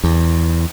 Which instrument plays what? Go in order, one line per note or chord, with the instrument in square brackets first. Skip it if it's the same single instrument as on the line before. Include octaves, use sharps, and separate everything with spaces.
[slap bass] E2